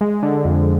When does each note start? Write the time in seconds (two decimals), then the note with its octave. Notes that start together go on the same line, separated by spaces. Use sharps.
0.01 G#3
0.23 D3
0.45 F2